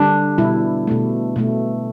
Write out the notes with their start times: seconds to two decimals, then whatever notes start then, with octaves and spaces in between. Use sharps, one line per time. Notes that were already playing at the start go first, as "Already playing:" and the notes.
Already playing: D3 G3 D4
0.38 B2 G3 E4
0.87 B2 A3
1.36 B2 A3